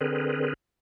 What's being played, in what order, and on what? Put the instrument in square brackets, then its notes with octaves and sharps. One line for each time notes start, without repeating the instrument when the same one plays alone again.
[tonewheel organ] D3 C4 G#4 A#4 B4